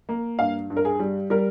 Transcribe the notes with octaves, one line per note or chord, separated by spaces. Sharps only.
A#3
G2 F5
G2
A#4
G#4
G3
G3 A#4